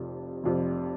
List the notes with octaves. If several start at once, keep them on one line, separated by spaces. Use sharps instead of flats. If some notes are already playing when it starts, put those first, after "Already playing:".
Already playing: F1 F2 C3
F1 F2 C3